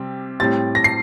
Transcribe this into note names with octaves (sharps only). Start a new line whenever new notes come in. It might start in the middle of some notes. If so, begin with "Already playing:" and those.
Already playing: C3 G3 C4
A2 G3 C4 A6
A#6
C7